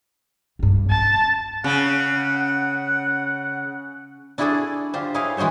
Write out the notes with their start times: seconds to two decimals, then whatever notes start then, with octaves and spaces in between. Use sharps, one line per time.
0.59 B1 G2
0.90 C#4 A5
1.64 C#3 F#5
4.38 D4 E4 F#4 G#4 A4 D5
4.93 D3 F4 G4 C5
5.14 E4 G#4 B4 C#5 D#5 F5
5.37 E3 G#3 F#4 C5 C#5